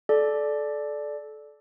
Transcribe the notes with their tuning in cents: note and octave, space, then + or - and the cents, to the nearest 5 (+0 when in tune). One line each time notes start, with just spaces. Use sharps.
A4 -25 D5 +0